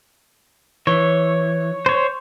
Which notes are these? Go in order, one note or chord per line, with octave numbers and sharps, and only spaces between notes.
E3 C#5
C5 C#5